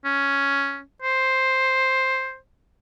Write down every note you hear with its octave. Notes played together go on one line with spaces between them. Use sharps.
C#4
C5